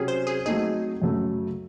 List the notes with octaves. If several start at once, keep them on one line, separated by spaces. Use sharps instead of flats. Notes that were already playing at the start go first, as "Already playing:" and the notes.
Already playing: C3 F#3 C#4 G#4
C5
G#4
F#3 A3 C4 D#4 G#4
F#2 C#3 F#3 A3